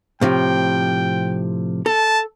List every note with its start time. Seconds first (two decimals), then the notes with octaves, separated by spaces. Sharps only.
0.21 A2 C3 F3 G5
1.86 A4 A5